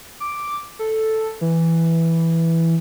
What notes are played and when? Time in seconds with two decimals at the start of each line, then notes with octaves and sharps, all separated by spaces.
0.20 D6
0.79 A4
1.41 E3